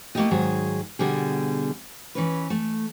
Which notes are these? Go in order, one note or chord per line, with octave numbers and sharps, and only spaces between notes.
A3 A#3 D4 E4 G4 D#5
G#2 D#3 F#3 G#4
B2 D3 G3 G#4
E3 C#4 B4
A3